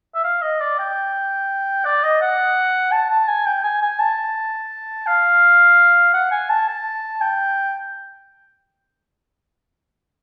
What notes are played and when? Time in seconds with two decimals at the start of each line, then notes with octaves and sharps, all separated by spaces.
0.15 E5
0.24 F5
0.42 D#5
0.60 D5
0.78 G5
1.85 D5
2.03 D#5
2.21 F#5
2.91 A5
3.10 A5
3.28 G#5
3.46 G5
3.64 G#5
3.81 G#5
3.99 A5
5.07 F5
6.13 F#5
6.31 G#5
6.49 A5
6.68 A5
7.21 G5